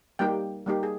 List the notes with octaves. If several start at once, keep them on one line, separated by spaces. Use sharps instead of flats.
G3 A#3 D#4 G4 G5
G3 A#3 D#4 G4
G#4